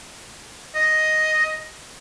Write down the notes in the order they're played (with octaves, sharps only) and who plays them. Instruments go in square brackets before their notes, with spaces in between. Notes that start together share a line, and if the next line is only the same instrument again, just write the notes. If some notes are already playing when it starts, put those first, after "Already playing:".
[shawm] D#5